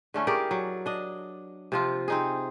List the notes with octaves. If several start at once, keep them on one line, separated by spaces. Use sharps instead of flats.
D3 A3 C#4 E4
G4 G#4 A#4 D5
F#3
D4 D#5
C3 F3 F4
C4 D#4 G#4